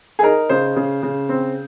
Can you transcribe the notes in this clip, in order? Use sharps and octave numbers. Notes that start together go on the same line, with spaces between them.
G#4
D#4 A#4
C#3 C5
C#3
C#3
C4